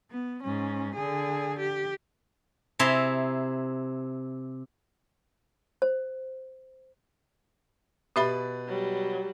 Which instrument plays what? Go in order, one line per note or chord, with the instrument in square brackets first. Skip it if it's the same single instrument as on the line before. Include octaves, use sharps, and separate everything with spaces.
[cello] B3
G#2 C#4
D3 G#4
G4
[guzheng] C3 E4 G#4 E5 A#5 C6
[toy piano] C5
[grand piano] B2 B4 A6 [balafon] G4 E5 B5
[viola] F#3 G3